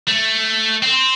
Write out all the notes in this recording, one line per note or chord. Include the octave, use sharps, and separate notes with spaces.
A3
C4